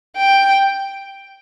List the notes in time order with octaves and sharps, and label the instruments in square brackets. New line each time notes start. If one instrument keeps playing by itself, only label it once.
[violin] G5